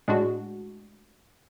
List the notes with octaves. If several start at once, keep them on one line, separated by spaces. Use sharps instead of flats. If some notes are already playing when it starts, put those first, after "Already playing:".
A2 G#3 D4 F#4